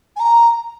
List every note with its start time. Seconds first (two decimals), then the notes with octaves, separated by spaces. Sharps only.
0.16 G#5
0.19 A#5